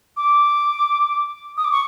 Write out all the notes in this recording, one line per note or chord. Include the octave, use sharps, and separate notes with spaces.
D6
D#6
D6
C#6